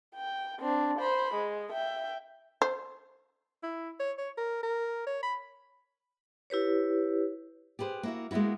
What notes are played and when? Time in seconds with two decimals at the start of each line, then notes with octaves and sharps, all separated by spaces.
0.15 G5
0.60 C4 D4
0.99 C5 B5
1.35 G#3
1.73 E5 G5
2.62 C5
3.63 E4
4.00 C#5
4.18 C#5
4.37 A#4
4.63 A#4
5.07 C#5
5.23 B5
6.50 E4 G4 B4 C#5
7.79 G4 G#4 B4 C5
8.03 A#3 E4 F#4
8.31 G#3 A#3 B3 E4 F#4